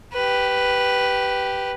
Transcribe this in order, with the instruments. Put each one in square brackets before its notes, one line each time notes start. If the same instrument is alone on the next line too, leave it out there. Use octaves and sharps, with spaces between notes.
[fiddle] G4 B4